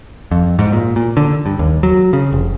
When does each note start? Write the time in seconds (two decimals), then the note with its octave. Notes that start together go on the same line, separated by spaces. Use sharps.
0.31 F2
0.59 G#2
0.72 A#2
0.96 A#2
1.17 D3
1.46 G2
1.59 D#2
1.83 F#3
2.13 C#3
2.32 F1